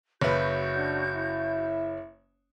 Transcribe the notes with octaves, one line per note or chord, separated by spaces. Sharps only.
F#1 F#4 B4 C#5 E5 G6
D4
E4